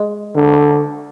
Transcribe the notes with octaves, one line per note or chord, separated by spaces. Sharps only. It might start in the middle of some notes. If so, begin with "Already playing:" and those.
Already playing: G#3
D3